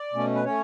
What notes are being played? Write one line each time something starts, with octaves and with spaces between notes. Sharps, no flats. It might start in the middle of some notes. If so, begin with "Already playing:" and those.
Already playing: D5
B2 A3 C#4
B4
A3 C#4 C#5